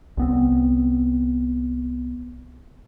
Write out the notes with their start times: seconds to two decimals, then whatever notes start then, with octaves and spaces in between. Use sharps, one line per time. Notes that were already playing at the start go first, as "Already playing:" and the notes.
0.17 C2 B3 C4